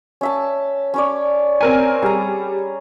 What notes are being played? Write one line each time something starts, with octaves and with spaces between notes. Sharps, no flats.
C#4 E5 A5
C#4 C#5 D5
C4 A#4 G#5
G3 G#4 A#5